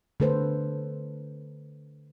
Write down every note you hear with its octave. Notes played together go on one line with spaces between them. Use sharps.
D3 A3 A4 B4 C5